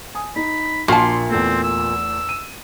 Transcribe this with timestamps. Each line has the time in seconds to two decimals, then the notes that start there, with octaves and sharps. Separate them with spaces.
0.15 G#5 D#6
0.36 D#4 B5
0.88 A#1 A#2 F#4 A5 C6
1.30 E2 A3 C4
1.64 E6
2.29 D#7